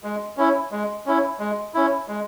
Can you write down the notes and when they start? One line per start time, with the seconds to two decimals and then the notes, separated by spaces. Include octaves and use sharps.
0.04 G#3
0.37 C#4 E4
0.71 G#3
1.06 C#4 E4
1.39 G#3
1.74 C#4 E4
2.08 G#3